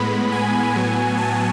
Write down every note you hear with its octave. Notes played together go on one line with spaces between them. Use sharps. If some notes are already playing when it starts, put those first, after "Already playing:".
Already playing: A2 G#3 B3 B5
G#5
A2 F#3 B3
A5